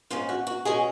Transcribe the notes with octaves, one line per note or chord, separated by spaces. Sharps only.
G#2 D#3 G#3 C#4 F4
F#4
F#4
B2 G#3 C#4 G#4